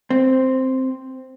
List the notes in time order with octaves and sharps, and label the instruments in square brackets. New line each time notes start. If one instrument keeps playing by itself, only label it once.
[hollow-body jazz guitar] C4